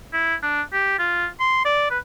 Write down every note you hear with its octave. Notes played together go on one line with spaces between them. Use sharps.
E4
D4
G4
F4
C6
D5
B4